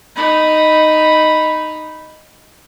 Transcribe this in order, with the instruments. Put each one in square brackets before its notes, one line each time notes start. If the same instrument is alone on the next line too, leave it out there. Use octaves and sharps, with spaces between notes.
[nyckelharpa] D#4 B5